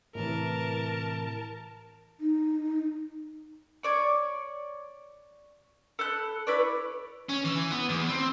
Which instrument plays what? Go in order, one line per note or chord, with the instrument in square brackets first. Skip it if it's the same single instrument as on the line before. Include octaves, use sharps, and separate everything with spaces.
[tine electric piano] A2 [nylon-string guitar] C3 E3 [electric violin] A#4 A5
[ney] D#4
[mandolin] C#5 D5 C#6
A4 B5 F#6
E4 B4 C#5 D5
[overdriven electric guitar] C#4
E3
B3
E2
C4